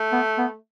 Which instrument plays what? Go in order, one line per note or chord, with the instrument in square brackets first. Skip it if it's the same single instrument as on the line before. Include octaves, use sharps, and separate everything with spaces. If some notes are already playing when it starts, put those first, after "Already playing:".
Already playing: [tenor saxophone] A3
[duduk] B3
B3